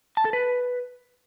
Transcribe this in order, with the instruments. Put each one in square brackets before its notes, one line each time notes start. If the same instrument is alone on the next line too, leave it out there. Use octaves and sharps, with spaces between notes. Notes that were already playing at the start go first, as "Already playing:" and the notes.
[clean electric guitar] A5
A4
B4